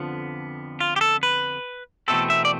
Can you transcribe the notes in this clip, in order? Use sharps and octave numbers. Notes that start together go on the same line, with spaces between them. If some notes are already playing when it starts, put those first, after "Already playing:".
Already playing: F2 D3 F3 B3
F4
G4
A4
B4
E2 B2 A3 C4 A4
E5
D5